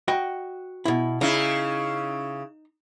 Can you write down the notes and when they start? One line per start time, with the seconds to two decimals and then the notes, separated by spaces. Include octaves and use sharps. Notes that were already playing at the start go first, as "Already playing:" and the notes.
0.08 F#4 D#5 G5
0.85 B2 E4
1.21 C#3 D#4 E4